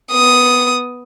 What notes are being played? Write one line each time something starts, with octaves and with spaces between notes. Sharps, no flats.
B3 D#6